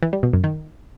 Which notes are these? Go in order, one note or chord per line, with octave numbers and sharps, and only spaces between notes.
E3
G3
B2
F#2
D#3